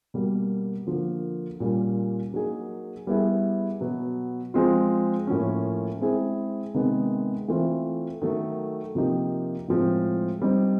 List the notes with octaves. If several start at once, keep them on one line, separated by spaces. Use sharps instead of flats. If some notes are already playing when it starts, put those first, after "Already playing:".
B2 G3 A#3
D3 F3 A#3
A#2 G3 A#3 C#4 F4
F#3 A#3 D#4 G#4
G3 B3 E4 G#4
B2 F#3 B3
F3 G#3 C4 F4
A2 F3 A#3 C#4
G#3 C4 E4 G#4
C3 D#3 G#3 B3 D#4
E3 A3 C4 F4
D#3 F#3 A3
C3 F3 A#3 D#4 G4
A2 F3 G#3 C4
G3 C4 D#4